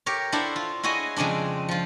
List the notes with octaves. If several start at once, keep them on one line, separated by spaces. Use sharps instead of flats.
G4 A#4 C#5
D4 E4 A4 C5 F5 F#5
F4
E4 F#4 G#4 C#5 D#5
F2 C#3 G#3 C4 D4
F3 F4